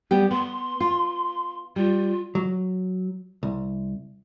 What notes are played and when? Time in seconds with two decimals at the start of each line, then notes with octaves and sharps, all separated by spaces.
0.11 G3 B3 G4
0.31 B3 C6
0.80 F4
1.76 G3 F4
2.35 F#3
3.43 C2